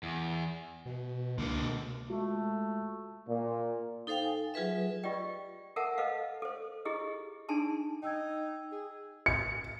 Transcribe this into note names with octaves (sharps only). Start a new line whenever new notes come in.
E2
B2
C#2 D3 A#3
B2
G#3 A3 F4 F#4
A#2
D#4 A4 C5 F5 G5
G#5
F#3 F4 G#4 B4 E5
F4 G4 D5 D#5 G5
A4 A#4 E5 F#5 A5
A4 B4 D#5 F5
A4 C5
E4 G4 G#4 D#5
D4 D#4 G#4 G#5 A5 C6
D#4 G5 E6 G#6
G#4
C#7